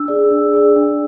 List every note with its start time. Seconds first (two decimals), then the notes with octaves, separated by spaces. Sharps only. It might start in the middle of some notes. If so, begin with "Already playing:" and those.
Already playing: D4 E6
0.08 G#4 D5
0.31 D4
0.53 G#4 D5
0.76 D4